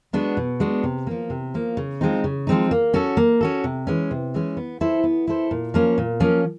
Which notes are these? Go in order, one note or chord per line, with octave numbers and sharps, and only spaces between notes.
G#3 B3 D4 F#4
B2
G#3 B3 D4 F#4
C3
F3 A#3
C3
F3 A#3
C#3
F3 G#3 C4 D#4
C#3
F3 G#3 C4 D#4
A#3
C#4 F#4 A4
A#3
C#4 F#4 A4
C3
E3 G#3 C#4
C3
E3 G#3 C#4
B3
E4 A4 C5
B3
E4 A4 C5
A#2
F3 A#3 C#4
A#2
F3 A#3 C#4